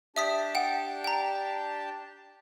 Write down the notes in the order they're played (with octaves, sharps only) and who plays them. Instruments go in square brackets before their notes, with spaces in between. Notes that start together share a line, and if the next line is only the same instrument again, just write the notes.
[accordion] D4 G4 A5 [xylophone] E5 D#6 B6
[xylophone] F#5 G5
G5 A#5